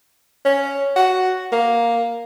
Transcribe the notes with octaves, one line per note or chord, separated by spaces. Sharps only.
C#4
F#4
A#3